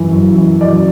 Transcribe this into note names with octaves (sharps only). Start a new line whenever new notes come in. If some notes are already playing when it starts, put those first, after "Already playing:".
Already playing: F#2 E3
F#2
E3
F#2 D5